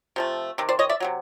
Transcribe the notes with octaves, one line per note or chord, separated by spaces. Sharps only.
C3 F3 A3
C3 D#3
C5 D5
C#5 D#5
D5 E5
C3 D#3 F#3